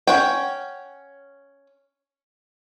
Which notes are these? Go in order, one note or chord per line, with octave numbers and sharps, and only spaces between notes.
C#4 F#5 G5